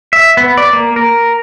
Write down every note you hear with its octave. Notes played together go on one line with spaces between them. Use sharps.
E5
B3
D5
A#3
A#4